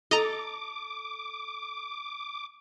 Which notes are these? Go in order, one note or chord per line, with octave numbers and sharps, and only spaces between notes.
A4 D#5 A#5 D6